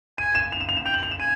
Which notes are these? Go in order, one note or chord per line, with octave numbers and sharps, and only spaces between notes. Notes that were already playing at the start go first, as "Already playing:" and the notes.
G#5 D#7
E7
F7
E7
F7
E7
G5 F7
F#7
F7
E7
G#5 D#7